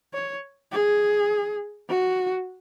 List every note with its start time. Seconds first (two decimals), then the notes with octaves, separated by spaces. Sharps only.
0.14 C#5
0.72 G#4
1.89 F#4